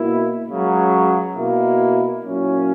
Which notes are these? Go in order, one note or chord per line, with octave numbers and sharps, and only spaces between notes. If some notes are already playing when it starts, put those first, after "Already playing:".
Already playing: B2 A#3 E4
C#2 C#3 F#3
B2 A#3 E4
A#2 F#3 C#4 E4